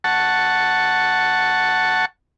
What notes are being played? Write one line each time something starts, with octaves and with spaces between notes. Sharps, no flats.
F#5 A5 C#6